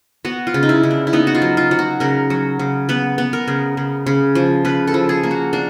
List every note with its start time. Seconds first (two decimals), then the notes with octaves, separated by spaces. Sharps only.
0.25 B3 F#4
0.47 F4
0.54 C#3
0.63 D#4
0.69 E4
0.83 C#3
0.91 D4
1.07 E4
1.13 B3 D#4
1.27 F#4
1.35 F4
1.42 F#3
1.57 F4
1.71 F#3
1.79 F#4
2.00 C#3 A#4
2.30 F#3
2.59 C#3
2.89 B3 B4
3.18 B3
3.33 A#4
3.48 C#3
3.77 C#3
4.06 C#3
4.35 F3
4.65 C#3 B4
4.87 A4
4.94 F3
5.09 G#4
5.23 A#3
5.31 F#4
5.53 A#3 D4